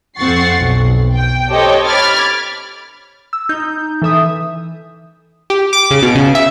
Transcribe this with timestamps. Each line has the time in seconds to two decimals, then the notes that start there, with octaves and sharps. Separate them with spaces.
0.17 F2 C4 F#5 C#6 A6 C7
0.59 B1
1.12 G5
1.50 G4 A4 C5 C#5 D#5 G5
1.85 B5 D6 F6 G#6 A6
3.33 E6
3.49 D#4 G6
4.02 E3 A4 E5 D#6
5.50 G4
5.73 D6
5.91 C#3
6.02 B2
6.15 C#3
6.35 E5